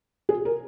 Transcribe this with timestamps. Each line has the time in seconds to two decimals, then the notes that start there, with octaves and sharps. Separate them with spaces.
0.29 G#4
0.45 A#4